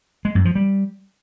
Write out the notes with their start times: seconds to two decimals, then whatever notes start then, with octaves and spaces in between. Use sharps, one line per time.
0.25 G#3
0.35 F#2
0.45 F3
0.55 G3